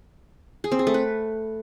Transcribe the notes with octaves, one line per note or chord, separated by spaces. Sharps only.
G#4
C4
G#4
A3
B4